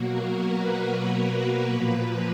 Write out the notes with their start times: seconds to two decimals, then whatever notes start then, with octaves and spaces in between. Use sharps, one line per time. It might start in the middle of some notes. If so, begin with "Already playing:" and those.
Already playing: B2 F#3 A#3 F#4
0.11 A#4
0.42 B4
1.68 A#2 F3 A#3